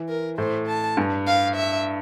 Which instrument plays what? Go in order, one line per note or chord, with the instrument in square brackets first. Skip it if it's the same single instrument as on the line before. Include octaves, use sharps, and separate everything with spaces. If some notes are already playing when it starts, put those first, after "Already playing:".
Already playing: [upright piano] E3
[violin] A#4
[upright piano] A2 [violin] C5
[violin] A5
[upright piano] G2
[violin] F5
E5